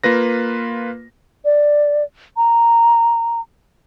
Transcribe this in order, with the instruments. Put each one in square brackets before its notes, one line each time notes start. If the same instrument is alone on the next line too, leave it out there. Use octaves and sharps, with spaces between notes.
[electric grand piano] A#3 F4 B4 A#6
[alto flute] D5
A#5